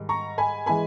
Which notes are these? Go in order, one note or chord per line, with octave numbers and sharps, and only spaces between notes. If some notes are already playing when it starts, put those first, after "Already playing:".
Already playing: G#2 D#3 G3
A#5 C#6
G#5 B5
E3 G#3 G#5 B5